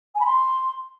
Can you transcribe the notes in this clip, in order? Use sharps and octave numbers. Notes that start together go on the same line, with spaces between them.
G#5
B5
C6